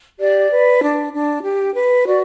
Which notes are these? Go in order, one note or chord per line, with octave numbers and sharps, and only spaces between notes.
G4 D5
B4
D4
D4
G4
B4
F#4 D5